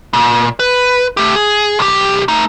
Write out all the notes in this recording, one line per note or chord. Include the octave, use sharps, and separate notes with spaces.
A#2
B4
A3 G4
G#4
B1 G4
A3 D#4